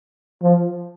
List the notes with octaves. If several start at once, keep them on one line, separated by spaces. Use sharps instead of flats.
F3